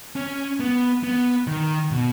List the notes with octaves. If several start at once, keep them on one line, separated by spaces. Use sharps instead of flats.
C#4
B3
B3
D#3
B2